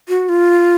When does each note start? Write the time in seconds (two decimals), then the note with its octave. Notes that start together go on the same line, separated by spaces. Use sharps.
0.09 F#4
0.29 F4